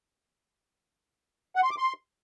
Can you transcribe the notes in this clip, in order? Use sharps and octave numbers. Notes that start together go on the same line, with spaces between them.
F#5
C6
D6
C6